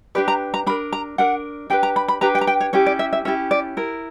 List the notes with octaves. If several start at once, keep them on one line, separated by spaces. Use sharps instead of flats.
D4 G4 B4 D5
A#5
A#5
D4 A#4 B5
A#5
D4 A#4 F#5
D4 G4 B4 G5
A#5
B5
B5
D4 G4 B4 A#5
G5
A#5
G5
C#5
C#4 E4 G4 C#5
D5
E5
E5
C#4 E4 G4 E5
D5
E4 A#4